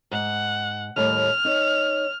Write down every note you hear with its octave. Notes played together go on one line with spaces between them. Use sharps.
G#2 F#5
D#2 A2 G3 F6
D#4 C#5